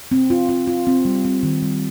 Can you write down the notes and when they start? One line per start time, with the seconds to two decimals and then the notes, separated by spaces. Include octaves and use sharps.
0.11 C4
0.30 F4
0.49 F4
0.67 F4
0.87 C4
1.05 G3
1.25 C4
1.43 D#3
1.62 G3